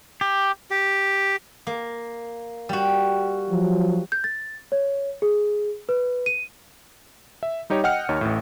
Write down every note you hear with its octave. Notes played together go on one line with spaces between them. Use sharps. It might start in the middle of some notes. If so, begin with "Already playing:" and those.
G4
G4
A#3
G3 F#4
F3 F#3
G6
A6
C#5
G#4
B4
D#7
E5
G3 D#4 G4 C#5
D#5 F#5 G5 F6 C#7
D#2 D#4 C#5
A1 A2